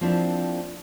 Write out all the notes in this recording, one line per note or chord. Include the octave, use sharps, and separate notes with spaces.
F3 A#3 C4 D4 E4